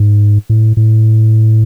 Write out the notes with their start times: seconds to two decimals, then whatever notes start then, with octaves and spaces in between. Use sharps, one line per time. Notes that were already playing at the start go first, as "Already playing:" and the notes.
Already playing: G#2
0.50 A2
0.77 A2